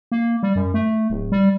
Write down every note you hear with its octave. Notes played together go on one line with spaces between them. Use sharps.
A#3
G3
F#2
A3
D1
G3